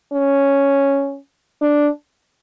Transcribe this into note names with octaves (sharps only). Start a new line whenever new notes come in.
C#4
D4